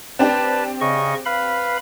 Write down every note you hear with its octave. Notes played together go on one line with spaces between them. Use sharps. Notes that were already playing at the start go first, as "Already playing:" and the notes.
C4 D4 G4 B4 A5
C#3 D#5 C#6
B4 F5 B5